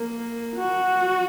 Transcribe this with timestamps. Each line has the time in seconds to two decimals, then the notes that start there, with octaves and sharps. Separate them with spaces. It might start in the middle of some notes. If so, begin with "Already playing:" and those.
Already playing: A#3
0.56 F#4